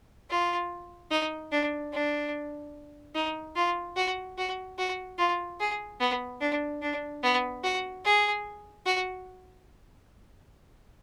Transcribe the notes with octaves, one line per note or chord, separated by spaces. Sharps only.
F4
D#4
D4
D4
D#4
F4
F#4
F#4
F#4
F4
G#4
B3
D4
D4
B3
F#4
G#4
F#4